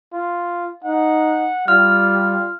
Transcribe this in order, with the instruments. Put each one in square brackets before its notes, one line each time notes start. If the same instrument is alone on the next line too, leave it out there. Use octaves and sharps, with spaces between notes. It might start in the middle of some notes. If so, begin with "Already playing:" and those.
[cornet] F4
[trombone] D#4 [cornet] F#5
[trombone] G3 [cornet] F4 [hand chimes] F6